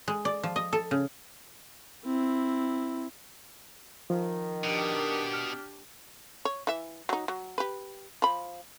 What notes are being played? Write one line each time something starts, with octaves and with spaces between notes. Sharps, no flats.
G#3
D5
F3
D#5
A4
C#3
C4 E4
D#3 F3
B2 D4 G4
F6
C#5
E3 E5
F#3 D#4
F#3
G4 B4
F3 B5